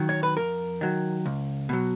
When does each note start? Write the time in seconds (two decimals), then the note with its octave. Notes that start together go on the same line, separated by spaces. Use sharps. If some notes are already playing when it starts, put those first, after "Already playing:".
Already playing: D#3 F#3
0.09 C#5
0.23 B4
0.37 F2 A#4
0.81 D#3 F#3
1.26 C#2
1.69 B2 F#3